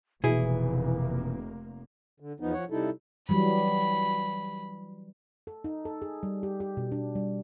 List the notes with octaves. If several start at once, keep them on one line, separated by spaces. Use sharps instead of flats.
F1 B2 E3 A#3 E4 G#4
D3
E2 F3 B3 D#4
F3 C#5 F#5
C3 G3 D#4 E4 A4
E3 F#3 G3 B5
A4
D#4
A4
G#4
G3
G4
G4
B2
D4
G3